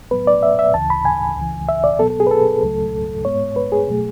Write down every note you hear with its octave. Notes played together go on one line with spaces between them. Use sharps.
A2 F#3 B3 B4
D5
E5
E5
D2 C#3 E3 A5
B5
G#5
C#2 C#3 E3
E5
D5
B2 F#3 B3 A4
A4
G#4
B4
A4
C#2 C#3 F#3 A3
G#2 G#3 B3 C#5
B4
G#4
B2 F#3 A3